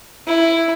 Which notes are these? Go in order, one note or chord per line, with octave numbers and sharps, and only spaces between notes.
E4